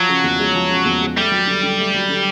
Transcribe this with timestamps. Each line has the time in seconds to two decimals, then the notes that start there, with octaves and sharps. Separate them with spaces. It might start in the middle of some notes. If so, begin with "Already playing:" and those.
Already playing: F3 F#3
0.09 C#3
0.24 E2
0.40 G#3
0.55 F3
0.70 C#3
0.86 E2
1.01 G#3
1.16 G3 A3
1.32 F#3
1.47 D3
1.63 D3
1.78 A3
1.94 F#3
2.10 D3